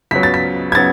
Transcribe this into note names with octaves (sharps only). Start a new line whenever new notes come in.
C#2 C#3 F#3 B3 B6
A6
B6
G#6
C#3 F#3 B3 A6